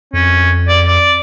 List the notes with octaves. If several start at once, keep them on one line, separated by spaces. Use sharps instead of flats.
F2 C#4
D5
D5